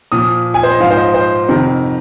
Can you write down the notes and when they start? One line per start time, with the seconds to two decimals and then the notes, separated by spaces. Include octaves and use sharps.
0.12 A#2 F3 D#6
0.54 G#5
0.63 C5
0.72 D#5
0.80 G#2 F3 F5
0.91 C5
0.97 D#5
1.14 C5
1.48 F2 C3 D#3